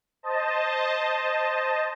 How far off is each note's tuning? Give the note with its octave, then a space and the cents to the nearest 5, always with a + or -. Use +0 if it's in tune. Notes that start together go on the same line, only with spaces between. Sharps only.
C5 +0 D#5 +0 A5 +0